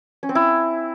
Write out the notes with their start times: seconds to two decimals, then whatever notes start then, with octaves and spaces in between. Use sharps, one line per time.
0.23 C#4
0.29 C4
0.35 E4